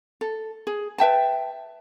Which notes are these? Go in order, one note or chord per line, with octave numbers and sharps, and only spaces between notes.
A4
G#4
B4 E5 G5 A5